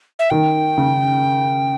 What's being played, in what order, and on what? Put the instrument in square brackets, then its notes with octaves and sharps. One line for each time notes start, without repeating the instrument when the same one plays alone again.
[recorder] E5
[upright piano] D#3 [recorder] G5
[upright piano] C#3